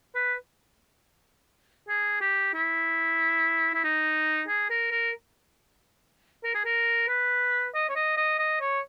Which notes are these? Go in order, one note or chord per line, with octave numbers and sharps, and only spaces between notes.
B4
G#4
G4
E4
E4
D#4
G#4
A#4
A#4
A#4
G#4
A#4
B4
D#5
C#5
D#5
D#5
D#5
C#5